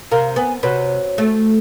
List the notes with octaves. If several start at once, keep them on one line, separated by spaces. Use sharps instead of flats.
C3 A#4 F5
B3 G#5
C3 F#4 B4 C#5
A3